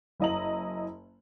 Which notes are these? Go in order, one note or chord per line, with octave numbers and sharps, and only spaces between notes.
F#1 E4 D#5 A#5 F#7